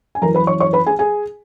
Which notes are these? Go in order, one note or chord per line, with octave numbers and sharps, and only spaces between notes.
G#5
F#2 E3 A#4 A#5
B4 B5
C#5 C#6
C#5 C#6
B4 B5
G#4 G#5
G#4 G#5